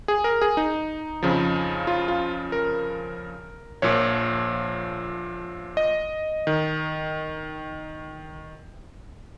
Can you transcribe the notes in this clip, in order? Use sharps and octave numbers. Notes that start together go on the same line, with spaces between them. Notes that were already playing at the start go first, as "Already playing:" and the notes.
G#4
A#4
G#4
D#4
F2 C#3 F3
F4
F4
A#4
A#1 A#2 F3 C#5
D#5
D#3